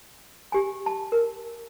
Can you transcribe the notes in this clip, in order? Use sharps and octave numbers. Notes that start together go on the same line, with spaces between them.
G4 G#5
A5
A#4